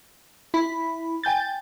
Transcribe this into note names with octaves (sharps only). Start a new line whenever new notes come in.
E4 B5
G5 G#5 G6 A6